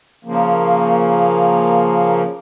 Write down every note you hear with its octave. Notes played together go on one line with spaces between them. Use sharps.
C#3 F3 A#3